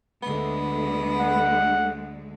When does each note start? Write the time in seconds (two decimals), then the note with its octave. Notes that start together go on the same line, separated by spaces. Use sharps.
0.23 D2 D3 G#3 B3
1.20 F#5